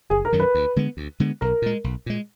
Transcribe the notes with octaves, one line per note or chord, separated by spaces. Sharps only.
F#1 G#4
A#4
F#2 D#3 F#3
B4
D2
D3 G#3 B3
D2
D3 G#3 B3
B1 A#4
A#2 G#3
B1
A#2 G#3